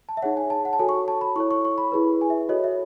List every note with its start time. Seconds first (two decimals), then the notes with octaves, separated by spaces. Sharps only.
0.09 A5
0.17 E5
0.22 D#4 G#4 C#5 F#5
0.37 G#5
0.50 A5
0.65 F#5
0.73 A5
0.79 F#4 A4 C#5 G#5
0.89 C#6
1.08 A5
1.21 B5
1.36 E4 A4 C#5 C#6
1.51 C#6
1.65 C#6
1.78 B5
1.92 E4 G#4 B4
2.21 G#5
2.30 E5
2.49 F#4 A4 C#5 D#5
2.64 E5